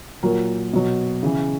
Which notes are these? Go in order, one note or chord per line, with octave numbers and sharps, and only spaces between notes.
A#2 F#3 A#4
B2 F#3
C#3 E3